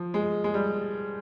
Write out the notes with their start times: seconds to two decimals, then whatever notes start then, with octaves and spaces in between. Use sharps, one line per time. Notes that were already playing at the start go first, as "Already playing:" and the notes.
Already playing: F3
0.14 G#3
0.44 G#3
0.54 G3